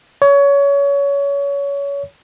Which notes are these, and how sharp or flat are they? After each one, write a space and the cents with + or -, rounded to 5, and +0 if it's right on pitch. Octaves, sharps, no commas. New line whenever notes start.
C#5 +25